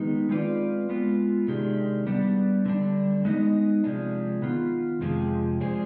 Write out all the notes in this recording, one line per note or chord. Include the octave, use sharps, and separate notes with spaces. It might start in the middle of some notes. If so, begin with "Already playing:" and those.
Already playing: D#3 G#3 B3 D#4
G#3 C4 F4 B4 D5
G#3 B3 F4
C3 D#3 G#3 D4 G4
G3 B3 D4
D3 G3 D4
G#3 B3 D#4 B4 D#5
C3 F3 G#3 D4
D#3 B3 F4
F2 C3 F3 G#3
F3 G#3 D4 G#4 C5